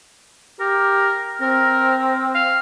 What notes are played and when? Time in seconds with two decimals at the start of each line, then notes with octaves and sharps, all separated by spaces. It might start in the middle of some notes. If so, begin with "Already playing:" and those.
0.60 G4 A#4
1.41 C4 A#4
2.34 F5